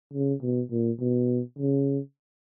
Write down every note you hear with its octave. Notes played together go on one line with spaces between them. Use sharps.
C#3
B2
A#2
B2
C#3